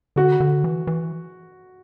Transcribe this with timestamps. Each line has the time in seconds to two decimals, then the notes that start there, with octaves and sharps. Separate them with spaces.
0.16 D3 F#4
0.40 D3
0.64 E3
0.87 E3